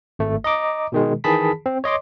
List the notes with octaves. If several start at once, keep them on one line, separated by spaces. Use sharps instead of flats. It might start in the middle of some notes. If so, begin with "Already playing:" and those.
G#1 A3
D#5 A#5 D6
B2 D#3 G#3
D#3 E3 G#4 A5 B5 B6
C4
C#5 D#5 C6 D6